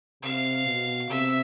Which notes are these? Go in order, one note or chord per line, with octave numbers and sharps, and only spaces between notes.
C3 F5
B2
C3 E5